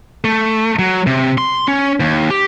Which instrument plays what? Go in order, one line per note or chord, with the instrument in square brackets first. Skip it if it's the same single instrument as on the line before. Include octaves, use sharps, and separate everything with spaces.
[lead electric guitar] A3
F#3
C3
C6
C#4
D#2
G4